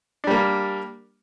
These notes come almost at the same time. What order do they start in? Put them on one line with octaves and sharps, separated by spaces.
D4 G3 A#3